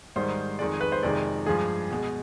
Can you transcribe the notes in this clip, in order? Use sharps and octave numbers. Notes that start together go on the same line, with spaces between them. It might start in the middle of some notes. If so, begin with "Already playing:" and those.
G#2 D#3 G3 C5
F2 D#3 G#3 D5
B4
C5
F2 C3 D#3 G#3 D5
G2 F3 G#3 G#4
B2 G#3